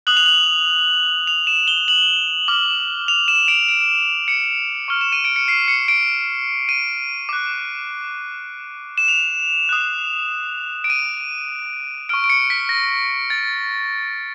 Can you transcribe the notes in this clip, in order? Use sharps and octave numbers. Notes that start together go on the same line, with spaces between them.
D#6 F#6 F#7
F7
F#7
F7
E7
G7
F#7
D6 F6
F7
E7
D7
D7
C#7
C#6 F6
E7
D#7
D7
C#7
C7
C#7
D7
D#7
D6 F#6
E7
F7
D#6 F#6
D7
D#7
C#6 F6 D7
D7
C#7
B6
A#6
A6